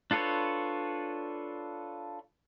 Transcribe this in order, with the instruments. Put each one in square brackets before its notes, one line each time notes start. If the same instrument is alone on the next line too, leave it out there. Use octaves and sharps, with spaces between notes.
[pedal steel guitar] D4 F4 A4 B4 C#5